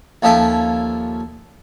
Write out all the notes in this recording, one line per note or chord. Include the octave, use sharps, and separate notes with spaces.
D#2 F3 C#4 A4 E5 G5